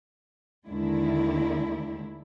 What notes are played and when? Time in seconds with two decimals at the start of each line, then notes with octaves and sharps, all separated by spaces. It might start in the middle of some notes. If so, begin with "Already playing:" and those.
0.68 D#2 D3 D#3 G#3 D4 E4